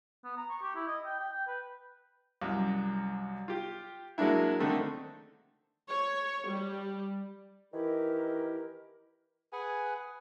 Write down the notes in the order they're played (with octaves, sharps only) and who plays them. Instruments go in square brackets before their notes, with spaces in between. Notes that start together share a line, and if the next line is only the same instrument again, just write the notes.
[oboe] B3
A#5
C#6
G4
E4
D#5
G5
G5
G5
B4
[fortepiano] C2 F#2
F4 G4
F#3 G#3 A#3 D4 E4
D3 D#3 A3 C4
[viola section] C#5
G3
[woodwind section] D#3 E3 E4 G4 A#4
[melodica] G#4 B4 F#5 G#5